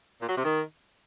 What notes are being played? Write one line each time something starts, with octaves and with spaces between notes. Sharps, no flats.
A#2
F#3
C3
D#3